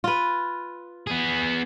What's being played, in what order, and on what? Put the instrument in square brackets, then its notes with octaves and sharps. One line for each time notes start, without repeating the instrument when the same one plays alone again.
[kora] F4 B4
[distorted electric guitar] B3 G#4